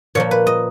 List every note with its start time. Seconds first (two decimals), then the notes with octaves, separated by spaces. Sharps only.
0.15 A#2 F3 A#3 C#5
0.31 B4
0.47 D#5